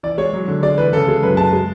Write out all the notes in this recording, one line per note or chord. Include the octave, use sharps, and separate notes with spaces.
E3 D5
G#3 C#5
F#3
D3
G#3 D5
E3 B4
C#3 A4
G#3
F#2 B4
G#3 A5
G#3